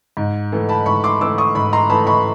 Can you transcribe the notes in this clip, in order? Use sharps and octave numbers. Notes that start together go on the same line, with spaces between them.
G#2
E3 A3
A5 B5
G#2 B5 C#6
C6 D6
E3 A3 D6 E6
C#6 D#6
G#2 B5 C#6
A#5 C6
E3 A3 A5 B5
B5 C#6